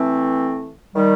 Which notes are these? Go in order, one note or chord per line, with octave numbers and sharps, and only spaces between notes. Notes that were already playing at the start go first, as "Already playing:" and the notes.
Already playing: E3 A3 C4
D#3 G3